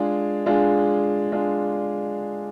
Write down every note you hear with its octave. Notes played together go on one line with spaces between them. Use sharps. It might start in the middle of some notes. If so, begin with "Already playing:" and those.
Already playing: G#3 D4 F4 G#4
G#3 D4 F4 G#4
G#3 D4 F4 G#4